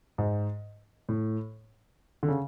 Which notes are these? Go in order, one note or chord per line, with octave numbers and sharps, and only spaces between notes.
G#2
A2
D3
C#3